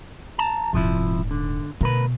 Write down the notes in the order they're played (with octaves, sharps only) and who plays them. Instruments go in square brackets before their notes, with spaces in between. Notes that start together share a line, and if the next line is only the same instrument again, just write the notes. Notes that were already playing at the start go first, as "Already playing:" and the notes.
[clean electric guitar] A5 A#5
[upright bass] D#1 G#2 [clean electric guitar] C3 F3 E4
[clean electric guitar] D3
[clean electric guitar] D2 A#4 B4 [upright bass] B2